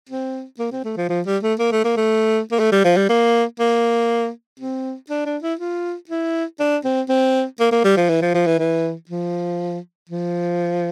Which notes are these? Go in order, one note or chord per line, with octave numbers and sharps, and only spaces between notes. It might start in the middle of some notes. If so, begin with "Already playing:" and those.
C4
A#3
C4
A3
F3
F3
G3
A3
A#3
A3
A#3
A3
A#3
A3
G3
F3
G3
A#3
A#3
C4
D4
D4
E4
F4
E4
D4
C4
C4
A#3
A#3
G3
F3
E3
F3
F3
E3
E3
F3
F3